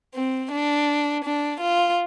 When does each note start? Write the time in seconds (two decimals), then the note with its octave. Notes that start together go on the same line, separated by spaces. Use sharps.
0.14 C4
0.51 D4
1.24 D4
1.60 F4